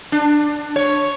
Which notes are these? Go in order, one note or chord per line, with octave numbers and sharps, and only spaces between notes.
D4
C#5